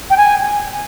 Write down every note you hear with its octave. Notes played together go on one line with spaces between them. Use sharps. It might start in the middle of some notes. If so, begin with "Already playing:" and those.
G5
G#5